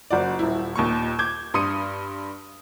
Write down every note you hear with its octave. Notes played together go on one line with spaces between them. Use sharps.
F#1 F#4 D5
D#1 E4
D#2 A#2 C#6
D6 G6 G#6
G2 C6 D#6 C#7 D#7